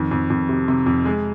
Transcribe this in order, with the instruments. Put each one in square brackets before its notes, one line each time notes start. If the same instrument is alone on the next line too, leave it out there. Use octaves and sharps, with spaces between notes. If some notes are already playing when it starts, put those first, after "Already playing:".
Already playing: [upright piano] F2 D#3
F2
F2
C3
C3
F2
G#3